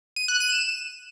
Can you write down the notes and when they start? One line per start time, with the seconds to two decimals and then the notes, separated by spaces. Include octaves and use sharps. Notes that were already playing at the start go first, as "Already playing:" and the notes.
0.16 D#7
0.28 F#6
0.40 D#7
0.52 E7